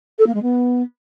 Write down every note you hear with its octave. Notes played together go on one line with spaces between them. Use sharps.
A4
A#3
G#3
B3